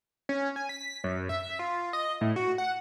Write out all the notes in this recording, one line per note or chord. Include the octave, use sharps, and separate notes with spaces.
C#4
G#5
B6
F#2
E5
F4
D#5
A2
F#4
F#5